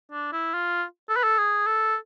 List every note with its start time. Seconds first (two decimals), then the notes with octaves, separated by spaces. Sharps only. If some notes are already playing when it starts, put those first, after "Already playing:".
0.12 D4
0.33 E4
0.54 F4
1.09 A4
1.17 B4
1.24 A4
1.38 G#4
1.66 A4